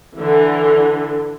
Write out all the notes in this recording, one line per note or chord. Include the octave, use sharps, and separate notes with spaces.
D3 E3